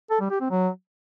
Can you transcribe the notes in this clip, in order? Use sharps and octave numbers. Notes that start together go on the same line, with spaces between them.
A4
G3
G4
C4
F#3